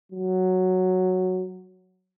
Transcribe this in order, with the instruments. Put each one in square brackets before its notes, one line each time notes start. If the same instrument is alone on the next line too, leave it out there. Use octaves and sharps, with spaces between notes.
[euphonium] F#3